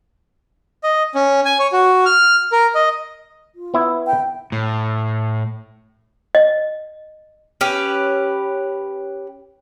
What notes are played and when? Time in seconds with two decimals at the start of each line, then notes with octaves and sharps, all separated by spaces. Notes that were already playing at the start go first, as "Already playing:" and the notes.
0.84 D#5
1.15 C#4
1.45 G#5
1.59 C#5
1.73 F#4
2.05 F6
2.52 A#4
2.75 D#5
3.55 F4
3.74 B3 E4
4.07 G5
4.52 A2
6.35 D#5
7.61 C#4 G4 B4